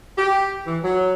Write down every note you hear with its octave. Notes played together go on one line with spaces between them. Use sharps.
G4
E3
F#3